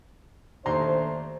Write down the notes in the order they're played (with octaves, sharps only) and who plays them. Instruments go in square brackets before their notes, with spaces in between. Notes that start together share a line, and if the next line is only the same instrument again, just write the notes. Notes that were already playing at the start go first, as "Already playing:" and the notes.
[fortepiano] D#2 A#5 C6 [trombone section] A3 D4 C5